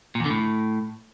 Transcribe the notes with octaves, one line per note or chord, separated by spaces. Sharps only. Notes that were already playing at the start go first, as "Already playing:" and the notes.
A#2
E2
D3
A2